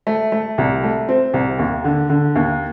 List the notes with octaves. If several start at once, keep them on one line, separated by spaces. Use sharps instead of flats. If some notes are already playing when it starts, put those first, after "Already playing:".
A3
A3
C2
A3
C4
C2
D#2
D3
D3
D#2